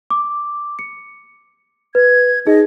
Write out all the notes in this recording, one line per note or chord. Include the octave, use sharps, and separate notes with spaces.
D6
C#7
B4 G#6
D#4 G#4 D#5